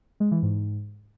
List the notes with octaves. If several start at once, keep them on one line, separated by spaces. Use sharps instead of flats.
G#3
E3
G#2